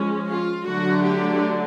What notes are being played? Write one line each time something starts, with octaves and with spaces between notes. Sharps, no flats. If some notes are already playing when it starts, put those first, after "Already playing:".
Already playing: F3 G#3 C#4
F4
D3 F#3 A3 D4 F#4
G4